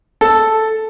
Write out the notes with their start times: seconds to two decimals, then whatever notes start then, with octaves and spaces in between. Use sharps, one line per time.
0.21 A4